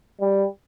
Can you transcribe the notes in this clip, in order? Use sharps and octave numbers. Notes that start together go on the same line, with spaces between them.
G3